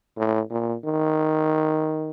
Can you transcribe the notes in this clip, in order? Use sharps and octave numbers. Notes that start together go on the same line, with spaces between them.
A2
A#2
D#3